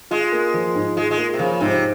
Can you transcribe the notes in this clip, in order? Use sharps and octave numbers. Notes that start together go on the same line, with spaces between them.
G#3 F4
A#3
F3
G#2
G#3 F4
G#3
A#3
C3
C#3 F3
G#2 C3